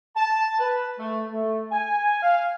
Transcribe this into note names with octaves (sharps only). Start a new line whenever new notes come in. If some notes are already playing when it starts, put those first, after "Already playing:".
A5
B4
A3
A3
G#5
F5